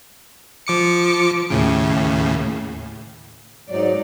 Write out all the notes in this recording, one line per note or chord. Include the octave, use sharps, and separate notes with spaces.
F3 D6 C#7
D#2 A2 C#3
G#2 F#3 D#4 D5